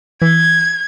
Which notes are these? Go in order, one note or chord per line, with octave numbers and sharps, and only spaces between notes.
E3 G#6